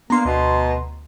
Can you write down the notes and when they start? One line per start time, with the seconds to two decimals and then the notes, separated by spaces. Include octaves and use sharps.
0.10 A#3 B3 D4 F5 A#5 C6
0.25 D2 B2